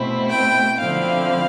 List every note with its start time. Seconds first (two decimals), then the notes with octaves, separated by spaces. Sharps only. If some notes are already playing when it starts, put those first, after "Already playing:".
Already playing: B2 A3 C4 E4
0.30 G5
0.79 D3 F3 C4 E4 F5